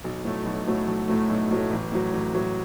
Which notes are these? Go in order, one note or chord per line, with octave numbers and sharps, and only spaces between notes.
B1
A2 F#3 A3
B1
A2 F#3 A3
B1
A2 F#3 A3
B1
A2 F#3 A3
A1
A2 F#3
A1
A2 F#3